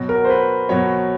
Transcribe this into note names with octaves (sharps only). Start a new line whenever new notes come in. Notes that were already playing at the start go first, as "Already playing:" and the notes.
Already playing: B2 F#3 F#4
A#4
C5
B4
B2 F#3 C#5